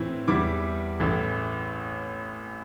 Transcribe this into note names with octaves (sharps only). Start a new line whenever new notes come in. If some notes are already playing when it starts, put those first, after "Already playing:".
Already playing: A2 E3 C4 E4
E2 E3 G3 E4 D6
A1 A2 E3